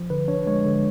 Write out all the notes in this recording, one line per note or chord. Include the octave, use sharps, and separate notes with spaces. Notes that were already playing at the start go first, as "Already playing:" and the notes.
Already playing: F3
D3 B4
D4 C#5
G#3 C#5
D3